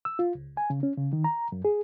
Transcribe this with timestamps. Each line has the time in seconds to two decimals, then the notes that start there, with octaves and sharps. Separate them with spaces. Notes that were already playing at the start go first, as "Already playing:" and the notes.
0.05 E6
0.19 F4
0.35 C#2
0.57 G#5
0.70 C#3
0.83 C#4
0.97 C#3
1.13 D#3
1.24 A#5
1.52 F#2
1.65 G#4